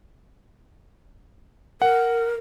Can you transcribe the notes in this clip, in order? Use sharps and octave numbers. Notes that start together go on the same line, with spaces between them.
A#4 F#5